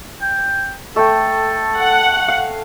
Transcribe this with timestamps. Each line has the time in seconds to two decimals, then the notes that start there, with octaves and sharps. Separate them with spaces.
0.22 G5
0.96 A3 A4 G5
1.78 F#5
2.28 F5